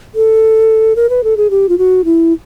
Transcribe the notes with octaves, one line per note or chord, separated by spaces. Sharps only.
A4
A#4
B4
A4
G#4
G4
F4
F#4
E4